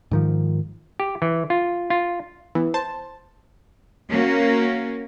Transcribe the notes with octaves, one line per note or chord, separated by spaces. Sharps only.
G#2 D#3 F3
G4
E3
F4
F4
E3 B3
C5 A5
A#3 C#4 F#4